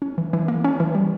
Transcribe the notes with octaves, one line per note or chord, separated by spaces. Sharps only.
C#4
E3
E3
A#3
C#4
E3
G3